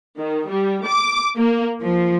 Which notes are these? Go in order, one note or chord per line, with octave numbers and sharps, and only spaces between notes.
D#3
G3
D6
A#3
F3